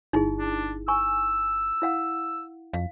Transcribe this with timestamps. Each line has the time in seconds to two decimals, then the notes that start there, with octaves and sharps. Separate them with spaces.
0.13 G1 D#4 E4 G#4
0.39 D4
0.88 G#5 C#6 E6
1.82 E4 F5 F#5
2.73 F2 F5